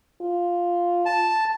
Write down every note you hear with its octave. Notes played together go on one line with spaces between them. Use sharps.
F4
A5